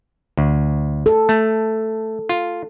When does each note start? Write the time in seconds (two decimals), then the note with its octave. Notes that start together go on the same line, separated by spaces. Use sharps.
0.37 D2
1.06 A4
1.29 A3
2.29 F4